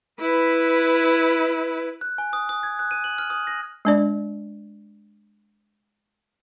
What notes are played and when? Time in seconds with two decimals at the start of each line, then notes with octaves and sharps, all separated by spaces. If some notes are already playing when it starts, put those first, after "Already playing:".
0.19 E4 B4
2.01 F#6
2.18 G#5
2.33 D#6
2.49 D#6
2.63 G#6
2.79 F#6
2.91 D#7
3.04 F#7
3.18 F6
3.30 D#6
3.47 A#6
3.85 G#3 D4 D5